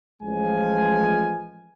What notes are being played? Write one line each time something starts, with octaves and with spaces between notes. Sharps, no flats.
A1 F3 G#3 G#5